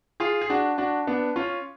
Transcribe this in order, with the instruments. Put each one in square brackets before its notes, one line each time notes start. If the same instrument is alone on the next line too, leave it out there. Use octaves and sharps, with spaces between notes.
[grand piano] F4 G#4
G#4
D4 F#4
D4 F#4
B3 D4
C#4 F4